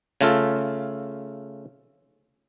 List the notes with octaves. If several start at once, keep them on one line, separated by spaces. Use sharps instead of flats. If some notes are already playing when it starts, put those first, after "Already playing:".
C#3 A3 F4 A4